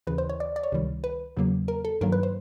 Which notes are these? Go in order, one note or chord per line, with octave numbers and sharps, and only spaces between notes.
D#2 C#3 E3 B4
C5
C#5
D5
D5
C#5
C#2 C3 D#3 G3
B4
E2 C#3 F#3 A#3
A#4
A4
G2 D#3 F#3 A#3 A#4
B4
C5